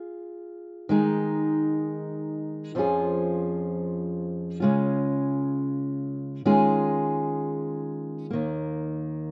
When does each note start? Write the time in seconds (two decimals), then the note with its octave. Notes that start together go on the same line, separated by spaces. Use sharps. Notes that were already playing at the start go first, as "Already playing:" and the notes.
Already playing: F4 G#4
0.89 D#3 G#3 D#4 G#4
2.75 F2 F3 C#4 F4 G#4
4.60 C#3 G#3 C#4 F4
6.45 D#3 G#3 C#4 F4 G#4
8.31 D#2 D#3 A#3